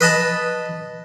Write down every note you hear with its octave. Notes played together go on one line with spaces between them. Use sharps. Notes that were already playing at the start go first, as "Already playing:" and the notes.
B4 D#5 A5 B5